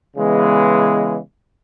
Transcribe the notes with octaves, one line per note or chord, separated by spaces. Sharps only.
C#3 E3 G#3 B3